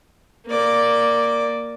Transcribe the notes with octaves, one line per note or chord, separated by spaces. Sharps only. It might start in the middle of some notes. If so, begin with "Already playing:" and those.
A#3 D5